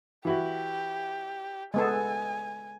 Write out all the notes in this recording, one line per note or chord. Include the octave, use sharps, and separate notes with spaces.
E3 E4 F#4 G4
G#3 B3 A4 G#5